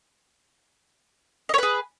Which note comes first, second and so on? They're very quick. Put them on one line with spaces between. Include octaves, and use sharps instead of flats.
D#5 C#5 B4 G#4